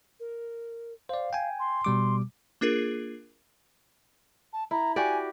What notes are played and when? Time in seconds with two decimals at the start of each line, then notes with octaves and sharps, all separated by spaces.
0.20 A#4
1.09 C5 D5 F5
1.33 G5 G#5
1.59 C6
1.85 B2 G3 D6
2.61 A#3 D4 F4 G#4 A#4
4.53 A5
4.71 E4 A#5
4.96 F#4 G4 D5 G#5